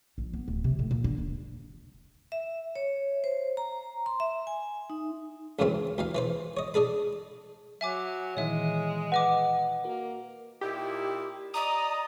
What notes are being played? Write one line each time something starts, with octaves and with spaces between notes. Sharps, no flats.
A#1
B3
D1
C3
A2
A#2
D3
D#1
E5
C#5
C5
A#5
C6
E5
G#5
D#4
C#2 F#2 C#3 E3 A3 C4
D2 E3 F5
E3 B4 C5
C#5 D#5
D4 G#4 A4 B5
F#3 E5 G#5 D6
A#2 D#3 E3 G#3 C#5 E5
B4 D#5 F#5 D6
A#3 F#4 A#4
A#2 D#4 E4 G4
D5 D#5 A#5 D#6